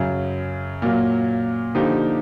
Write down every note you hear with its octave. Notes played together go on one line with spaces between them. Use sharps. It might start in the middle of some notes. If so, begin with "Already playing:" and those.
Already playing: F#2 C#3 F#3
A#2 F#3 A#3
D3 F3 A#3 D#4 G4